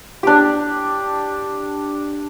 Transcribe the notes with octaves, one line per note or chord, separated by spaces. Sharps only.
D4 G4